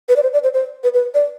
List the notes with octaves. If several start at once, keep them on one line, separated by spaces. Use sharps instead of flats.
B4
D5
C5
D5
C5
C5
B4
B4
D5